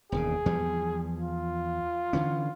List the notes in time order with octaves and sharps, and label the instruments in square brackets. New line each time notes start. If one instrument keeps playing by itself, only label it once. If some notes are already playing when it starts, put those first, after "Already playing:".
[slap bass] E1 D#2 C#3 [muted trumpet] G#4
[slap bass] E2 F3 G3
[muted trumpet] F4
[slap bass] D3 E3 C#4